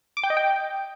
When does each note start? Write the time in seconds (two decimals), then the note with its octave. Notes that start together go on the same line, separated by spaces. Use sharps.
0.17 D6
0.23 G5
0.30 D#5
0.37 G5